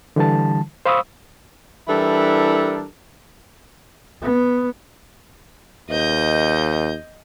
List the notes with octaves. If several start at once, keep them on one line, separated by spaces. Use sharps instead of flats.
D3 E3 G3 A5
C5 F5 B5 C#6 D#6 E6
E3 G3 D4 E4 A4 A#4
B3
D#2 D#5 G6